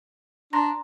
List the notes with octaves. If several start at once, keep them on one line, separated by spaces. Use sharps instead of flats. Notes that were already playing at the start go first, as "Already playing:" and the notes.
D4 A#5 C6 A#6